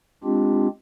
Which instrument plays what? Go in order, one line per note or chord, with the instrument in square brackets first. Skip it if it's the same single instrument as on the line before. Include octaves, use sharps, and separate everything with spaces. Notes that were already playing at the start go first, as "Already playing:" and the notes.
[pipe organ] G#3 C4 D4 F4 G4